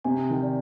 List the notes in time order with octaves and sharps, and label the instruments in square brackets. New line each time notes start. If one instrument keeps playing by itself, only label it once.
[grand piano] C3 [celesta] G#5
[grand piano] D#3
[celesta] D5